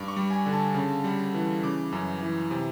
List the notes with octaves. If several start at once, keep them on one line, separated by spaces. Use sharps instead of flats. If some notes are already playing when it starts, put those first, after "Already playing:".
Already playing: G2 D6
C#6
G3
G#5
D3
A5
C#3
G3
E3
C#3 D6
F#2
E3
C3